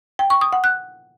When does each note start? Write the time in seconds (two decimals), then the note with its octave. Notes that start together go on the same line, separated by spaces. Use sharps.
0.19 G5
0.30 C#6
0.41 D#6
0.53 F#5
0.64 F#6